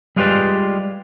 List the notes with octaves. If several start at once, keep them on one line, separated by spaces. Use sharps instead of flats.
G3 G#3 F4 G4 B4 D5